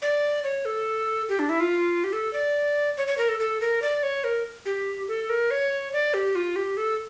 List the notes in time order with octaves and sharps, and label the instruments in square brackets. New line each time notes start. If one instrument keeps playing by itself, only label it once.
[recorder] D5
C#5
A4
G4
D4
E4
F4
G4
A4
D5
C#5
C#5
A#4
A4
A4
A#4
D5
C#5
A#4
G4
A4
A#4
C#5
D5
G4
F4
G4
A4